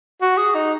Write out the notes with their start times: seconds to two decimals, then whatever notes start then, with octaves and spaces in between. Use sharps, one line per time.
0.22 F#4
0.37 G#4
0.55 D#4